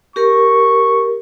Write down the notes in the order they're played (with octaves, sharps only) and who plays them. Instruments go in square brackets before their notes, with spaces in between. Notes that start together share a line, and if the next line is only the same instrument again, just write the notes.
[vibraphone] G4 A#4 [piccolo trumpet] C#6